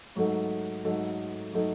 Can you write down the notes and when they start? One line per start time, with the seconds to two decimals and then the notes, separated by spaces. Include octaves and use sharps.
0.16 G#2 F#3 A3 D#4 A4
0.84 G#2 F#3 A3 D#4 A4
1.53 F#3 A3 D#4 A4